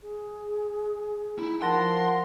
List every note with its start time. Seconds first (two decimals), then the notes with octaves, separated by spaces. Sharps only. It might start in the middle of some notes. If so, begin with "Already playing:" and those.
0.03 G#4
1.39 D#4 E4
1.62 F3 A#4 F#5 A5 C6 A#6